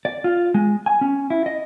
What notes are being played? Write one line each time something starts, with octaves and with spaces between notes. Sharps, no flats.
D5
F4
G#3
G#5
C#4
E4
D#5